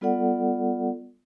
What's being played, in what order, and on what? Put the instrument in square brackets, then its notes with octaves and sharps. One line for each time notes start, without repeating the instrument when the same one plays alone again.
[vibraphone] G3 B3 F4 A4 D5 F#5